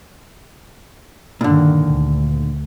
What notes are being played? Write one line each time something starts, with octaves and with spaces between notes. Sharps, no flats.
G2 A#2 D3 D#3
D2